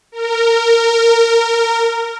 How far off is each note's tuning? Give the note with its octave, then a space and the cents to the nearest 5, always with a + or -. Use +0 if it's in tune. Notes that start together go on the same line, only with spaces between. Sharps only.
A#4 -20